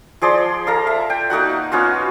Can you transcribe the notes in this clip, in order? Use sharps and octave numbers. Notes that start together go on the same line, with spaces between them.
F3 G#4 D5 C6
A4 F5 A#5
E5
G5
A#3 D#4 F#4 F#5
B3 C#4 F4 F#4